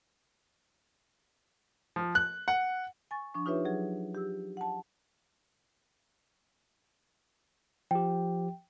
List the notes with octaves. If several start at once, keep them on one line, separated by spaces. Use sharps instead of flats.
F3
F#6
F#5
G#5 C#6 A6
F3 D4 C#6
D#4 F4 G4 B4 C#5 E5
F#3 G#4
G4 E6
F#5 A5
F3 G4 G5